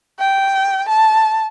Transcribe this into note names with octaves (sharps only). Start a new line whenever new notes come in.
G5
A5